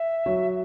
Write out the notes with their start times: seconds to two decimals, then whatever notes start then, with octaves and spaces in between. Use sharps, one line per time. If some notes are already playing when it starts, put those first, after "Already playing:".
Already playing: E5
0.26 F#3